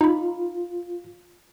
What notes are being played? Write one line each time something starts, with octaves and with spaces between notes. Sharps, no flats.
D#4 F4 B5